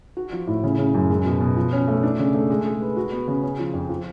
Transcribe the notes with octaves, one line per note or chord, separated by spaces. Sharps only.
F#4
F3
A2
C#3
C#3
F#2
G#3
B2
B2
F3
C#4
A3
D4
C#3
A3
G#3
G#4
B4
F#4
B3
C#3
C#4
F3
F2
F3